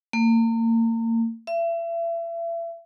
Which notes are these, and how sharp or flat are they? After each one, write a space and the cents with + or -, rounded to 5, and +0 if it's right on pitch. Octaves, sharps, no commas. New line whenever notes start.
A#3 -35
E5 +35